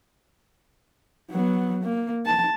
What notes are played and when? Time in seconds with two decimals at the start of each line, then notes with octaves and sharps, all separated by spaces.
1.31 F#3 B3
1.83 A#3
2.26 A5